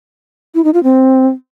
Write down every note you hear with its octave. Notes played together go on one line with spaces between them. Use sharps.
E4
D#4
F4
C4